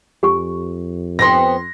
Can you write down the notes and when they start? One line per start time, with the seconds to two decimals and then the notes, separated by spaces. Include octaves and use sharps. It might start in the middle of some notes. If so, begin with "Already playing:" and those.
0.23 F2 G4 G#5 C#6
1.19 B3 C4 G4 C6 A#6